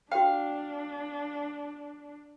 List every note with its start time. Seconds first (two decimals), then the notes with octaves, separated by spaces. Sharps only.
0.12 D4 F#4 F5 G5